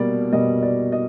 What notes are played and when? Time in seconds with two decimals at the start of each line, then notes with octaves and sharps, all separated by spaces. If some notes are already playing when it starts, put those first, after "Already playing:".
Already playing: B2 G3 A#3 D5
0.33 B2 G3 A#3 D#5
0.63 D5
0.92 D#5